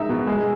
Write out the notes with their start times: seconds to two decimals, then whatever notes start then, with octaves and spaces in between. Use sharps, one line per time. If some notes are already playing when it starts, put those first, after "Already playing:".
Already playing: G#3 D#4 E5
0.09 B2
0.27 G#3